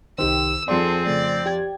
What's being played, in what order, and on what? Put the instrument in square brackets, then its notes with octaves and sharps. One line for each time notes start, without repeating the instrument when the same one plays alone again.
[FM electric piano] C2 D#4 C5 [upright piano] D#3 G4 [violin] E6
[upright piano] F2 F4 C6 [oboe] C4 [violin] G#4 A4 [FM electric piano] D5
[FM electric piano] C#3 A3 [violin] D5
[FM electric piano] G4 G5 G#6